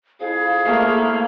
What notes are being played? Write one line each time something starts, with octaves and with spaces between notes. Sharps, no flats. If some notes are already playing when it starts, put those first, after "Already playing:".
F2 E4 G#4 F5
A3 A#3